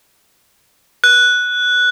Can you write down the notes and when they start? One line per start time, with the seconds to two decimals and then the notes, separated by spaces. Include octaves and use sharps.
1.04 F#6